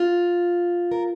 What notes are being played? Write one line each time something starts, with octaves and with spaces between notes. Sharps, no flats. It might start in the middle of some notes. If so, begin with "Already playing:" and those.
Already playing: F4
A#4